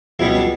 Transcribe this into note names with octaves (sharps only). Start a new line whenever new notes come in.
C#2 B2 G3 E4
D4